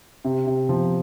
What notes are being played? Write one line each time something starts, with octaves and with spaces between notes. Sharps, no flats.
C3
C3
F3